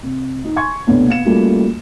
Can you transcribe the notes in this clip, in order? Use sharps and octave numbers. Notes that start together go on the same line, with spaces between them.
C3
D#4
G#5 C6 C#6 G#6
C2 B2 A3 B3 D4 C#5
B3 F5 C#7 E7
G3 A3 A#3 C#4 F4 F#4